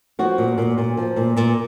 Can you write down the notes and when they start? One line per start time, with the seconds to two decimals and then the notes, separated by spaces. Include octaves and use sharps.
0.19 F3 F#4
0.38 A#2
0.58 A#2
0.78 A#2
0.97 F3
1.16 A#2
1.37 A#2